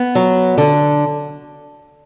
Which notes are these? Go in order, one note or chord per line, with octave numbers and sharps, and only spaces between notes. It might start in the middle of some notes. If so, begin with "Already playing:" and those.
Already playing: B3
F#3
D3